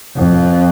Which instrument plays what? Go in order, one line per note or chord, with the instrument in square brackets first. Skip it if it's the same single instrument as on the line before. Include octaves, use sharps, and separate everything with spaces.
[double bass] F2